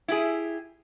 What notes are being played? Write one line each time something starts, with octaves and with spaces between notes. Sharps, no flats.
E4 G4 G#4